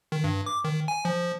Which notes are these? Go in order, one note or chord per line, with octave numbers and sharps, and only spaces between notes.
D#3
G2
D6
D#3
G#5
F3